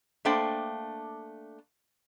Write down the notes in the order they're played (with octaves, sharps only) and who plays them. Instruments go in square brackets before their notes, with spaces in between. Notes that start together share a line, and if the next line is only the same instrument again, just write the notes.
[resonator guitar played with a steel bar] A3 A#3 D4 C5 G5